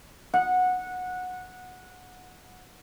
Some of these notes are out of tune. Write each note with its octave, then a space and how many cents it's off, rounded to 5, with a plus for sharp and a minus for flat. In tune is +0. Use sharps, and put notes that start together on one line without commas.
F#5 -15